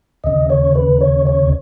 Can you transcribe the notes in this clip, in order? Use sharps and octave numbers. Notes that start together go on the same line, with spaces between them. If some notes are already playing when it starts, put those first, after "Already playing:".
D#2 C#3 D#5
C#5
B4
C#5
C#5